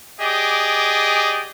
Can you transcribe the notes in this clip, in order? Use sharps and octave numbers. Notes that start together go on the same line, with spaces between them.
G4 G#4 D5 D#5